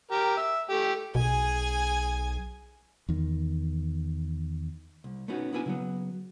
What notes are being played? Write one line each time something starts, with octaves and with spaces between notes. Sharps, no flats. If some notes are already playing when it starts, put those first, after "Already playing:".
G4 A#4
E5
A3 G4
B1 B2 G#4 G#5
E2 D#3
C2
A3 B3 C#4 D#4 F#4
B3 D4 E4 B4 G#5
C#3 F#3 B3